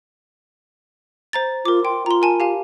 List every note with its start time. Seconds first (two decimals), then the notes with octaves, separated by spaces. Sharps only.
1.33 C5 A#5 A6
1.65 F4 A#4 D6
1.85 G5 C6
2.06 F4 A#5 C6
2.22 A#4 G#5 A5
2.40 G4 F5 G#5